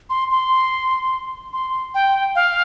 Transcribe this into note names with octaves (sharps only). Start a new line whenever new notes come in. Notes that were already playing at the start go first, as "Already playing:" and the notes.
C6
C6
C6
G5
F5